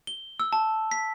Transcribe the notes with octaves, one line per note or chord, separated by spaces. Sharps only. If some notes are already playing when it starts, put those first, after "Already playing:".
G7
E6
A5
B6